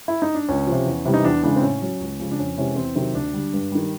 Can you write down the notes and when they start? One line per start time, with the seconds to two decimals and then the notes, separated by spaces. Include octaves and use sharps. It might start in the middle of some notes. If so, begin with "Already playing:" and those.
0.08 E4
0.22 D#4
0.35 D4
0.49 C#2 C#4
0.67 F3
0.72 C3
0.86 E2
1.05 C3 E3 G3
1.14 D#4
1.24 E2 D4
1.43 C#3 E3 G#3 D4
1.56 C4
1.63 A2 C#4
1.82 F#3
2.00 C#2
2.20 C#3 F3 G#3
2.31 D4
2.39 F2 C#4
2.58 C3 E3 G#3 C#4
2.76 E2 C4
2.95 C3 D#3 F#3 C4
3.14 D2 D4
3.34 D3 G3
3.53 G2
3.72 D#3 G3